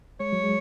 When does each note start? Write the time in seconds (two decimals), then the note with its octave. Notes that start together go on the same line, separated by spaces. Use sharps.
0.20 G#3 C#5
0.32 F#3
0.43 G#3